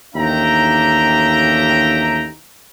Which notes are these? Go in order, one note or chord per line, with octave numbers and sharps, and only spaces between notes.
A1 D#2 D4 E5 G5 A#5